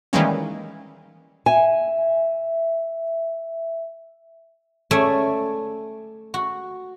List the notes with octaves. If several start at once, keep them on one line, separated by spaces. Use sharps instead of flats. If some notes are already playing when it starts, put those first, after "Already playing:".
D#3 E3 G3 G#3 A#3 C#4
E5 G#5
A3 C#4 D5 E5 G#5 A5
F#4